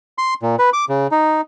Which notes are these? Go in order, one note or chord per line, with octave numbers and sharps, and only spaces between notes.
C6
A#2
B4
D6
C#3
D#4